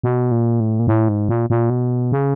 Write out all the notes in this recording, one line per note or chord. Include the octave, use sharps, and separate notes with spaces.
B2
A#2
A2
A#2
A2
G#2
A#2
A#2
B2
C#3